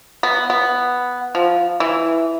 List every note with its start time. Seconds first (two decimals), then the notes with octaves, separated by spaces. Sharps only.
0.23 B3
0.50 B3
1.35 F3
1.80 E3